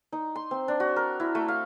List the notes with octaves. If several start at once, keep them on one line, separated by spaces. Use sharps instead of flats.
D#4
C6
C4
D4
F#4
A#4
E4
A3
F5